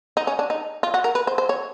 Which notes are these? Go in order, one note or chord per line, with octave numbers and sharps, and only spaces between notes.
D#4
C#4
D4
D#4
F4
F#4
A#4
B4
C5
C5
C#5